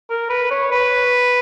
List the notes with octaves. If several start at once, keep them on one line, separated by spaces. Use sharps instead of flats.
A#4
B4
C#5
B4